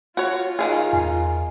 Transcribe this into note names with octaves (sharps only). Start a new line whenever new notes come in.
F4 F#4 C#5
D#3 F3 G#4
E2 G#5